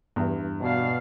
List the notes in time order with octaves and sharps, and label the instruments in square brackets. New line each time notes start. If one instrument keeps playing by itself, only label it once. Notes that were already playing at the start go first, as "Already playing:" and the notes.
[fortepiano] E2 [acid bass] G2
[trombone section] B2 [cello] D4 F5